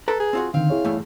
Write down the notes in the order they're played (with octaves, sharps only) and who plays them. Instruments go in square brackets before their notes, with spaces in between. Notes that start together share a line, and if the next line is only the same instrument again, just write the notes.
[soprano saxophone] A4 [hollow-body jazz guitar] B4 A#5
[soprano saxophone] G#4
[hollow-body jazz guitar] C4 F4 F#4
[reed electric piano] D3 D#3 [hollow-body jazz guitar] C4 [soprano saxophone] F5
[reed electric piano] E4 G#4 C#5
[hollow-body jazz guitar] E2 G2 A3